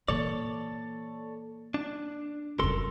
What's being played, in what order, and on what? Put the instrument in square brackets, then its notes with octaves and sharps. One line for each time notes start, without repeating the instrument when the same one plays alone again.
[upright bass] A#2 E3 [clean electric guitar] A4 C#5 D5
[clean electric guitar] D4
[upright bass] F1 F#2 [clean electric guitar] A4 A#4 C6